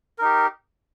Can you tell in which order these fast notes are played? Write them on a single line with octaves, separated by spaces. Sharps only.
A#4 D#4 G4